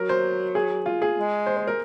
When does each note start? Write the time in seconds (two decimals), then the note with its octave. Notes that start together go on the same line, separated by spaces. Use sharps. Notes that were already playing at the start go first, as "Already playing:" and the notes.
Already playing: F#3 A#4
0.09 C5
0.55 G#4
0.86 F4
1.02 G#4
1.17 G#3
1.46 C5
1.57 C5
1.67 A#4